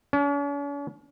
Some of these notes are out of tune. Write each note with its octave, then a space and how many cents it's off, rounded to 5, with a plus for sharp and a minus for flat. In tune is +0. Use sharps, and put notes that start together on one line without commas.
C#4 +45